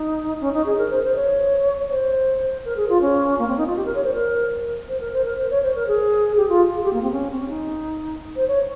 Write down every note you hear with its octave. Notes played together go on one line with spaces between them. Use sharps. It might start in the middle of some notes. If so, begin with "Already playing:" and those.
Already playing: D#4
C#4
D#4
G#4
A#4
C5
C5
C#5
C5
A#4
G#4
F4
C#4
A#3
C4
D#4
F4
G4
A#4
C#5
C5
A#4
C5
A#4
C5
A#4
C5
C#5
C5
A#4
G#4
G4
F4
G#4
G4
A#3
C4
C#4
C4
C#4
D#4
C5
C#5